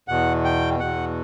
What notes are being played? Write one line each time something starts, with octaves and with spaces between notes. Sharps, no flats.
E2 B2 F#5
G5
E2 B2 F#5